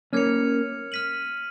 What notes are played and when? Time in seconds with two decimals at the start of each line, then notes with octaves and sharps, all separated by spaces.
0.13 A#3 C#4 F6 G#6 C#7 F7
0.92 F6 B6 D#7 F#7